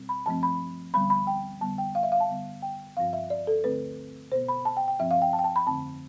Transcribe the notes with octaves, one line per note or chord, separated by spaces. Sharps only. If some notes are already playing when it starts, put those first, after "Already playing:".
Already playing: B2 G3 C4
B5
G2 F3 A3 C4 A5
B5
D2 D3 G3 B3 B5
B5
G5
F2 D3 G3 B3 A5
G5
F5
E5
F5
A5
G2 D3 G3 B3
G5
G2 F3 C4 F5
E5
D5
A4
D2 D3 A3 C4 B4
B2 B3 C5
B5
A5
G5
G5
G2 F3 C4 E5
F5
G5
A5
G5
A5
B5
F2 D3 A3 C4 A5